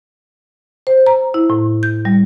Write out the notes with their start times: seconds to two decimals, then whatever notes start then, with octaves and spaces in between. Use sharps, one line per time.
0.87 C5
1.07 A#5
1.34 E4
1.50 A2
1.83 G6
2.05 G3